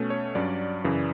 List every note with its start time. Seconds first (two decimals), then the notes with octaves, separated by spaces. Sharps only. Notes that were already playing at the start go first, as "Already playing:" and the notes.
Already playing: B2 A3 C#4
0.10 C#5
0.35 G2 F#3 C#4 D5
0.84 F#2 C#3 E3